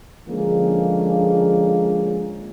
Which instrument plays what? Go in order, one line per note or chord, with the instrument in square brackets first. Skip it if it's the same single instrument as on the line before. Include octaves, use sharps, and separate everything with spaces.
[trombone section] D3 F3 G#3 A#3 C#4 G#4